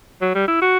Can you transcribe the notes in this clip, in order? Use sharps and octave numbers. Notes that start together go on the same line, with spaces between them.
F#3
G3
E4
F#4